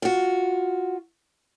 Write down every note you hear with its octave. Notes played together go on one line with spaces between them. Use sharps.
F4 F#4